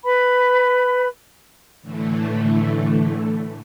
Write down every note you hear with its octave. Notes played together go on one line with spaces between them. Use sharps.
B4 B5
A2 D3 E3 A3